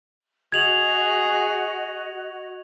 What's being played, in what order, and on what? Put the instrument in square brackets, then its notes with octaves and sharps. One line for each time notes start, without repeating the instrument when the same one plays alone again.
[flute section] F#4 D#5 [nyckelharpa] G#4 [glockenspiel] G#6 F7 F#7